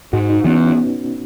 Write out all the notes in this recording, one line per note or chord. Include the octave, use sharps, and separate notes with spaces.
G#2 F#4
D#4
E3 B3 C#4
C#4
B3